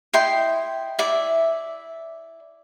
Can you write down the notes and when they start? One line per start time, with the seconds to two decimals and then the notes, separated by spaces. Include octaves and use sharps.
0.13 E4 D#5 G5 C6
0.99 E4 D5 E5